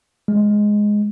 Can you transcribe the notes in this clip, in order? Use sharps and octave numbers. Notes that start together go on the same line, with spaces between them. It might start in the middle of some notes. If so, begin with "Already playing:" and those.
G#3